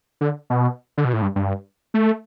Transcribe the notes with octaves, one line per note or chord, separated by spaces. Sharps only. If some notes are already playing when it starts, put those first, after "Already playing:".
D3
B2
D3
B2
A2
G2
G2
A3